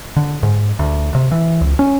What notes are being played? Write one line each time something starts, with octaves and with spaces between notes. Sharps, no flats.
D3
G#2
D2
C3
E3
C#2
C#4